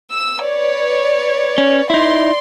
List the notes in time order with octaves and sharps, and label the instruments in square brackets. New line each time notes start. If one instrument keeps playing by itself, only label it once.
[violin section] E6
B4 C#5 D5
[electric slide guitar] C#4
[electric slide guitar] D#4 E4 [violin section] D5 C6